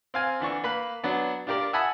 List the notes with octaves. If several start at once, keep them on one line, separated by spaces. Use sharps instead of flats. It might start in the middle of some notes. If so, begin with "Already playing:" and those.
C4 F5 G#5
D3 E3 D4 C#6
A#3 B4 B5 F#6
F#3 B3 D4
D4 F4 G4 A#4 D5
E5 F#5 G#5 A5 B5 D#6